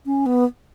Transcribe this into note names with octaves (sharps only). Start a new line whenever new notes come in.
C#4
B3